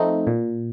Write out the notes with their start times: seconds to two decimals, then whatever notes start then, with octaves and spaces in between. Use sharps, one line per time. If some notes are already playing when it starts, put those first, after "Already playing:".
Already playing: F3 A3 C4 D#4
0.27 A#2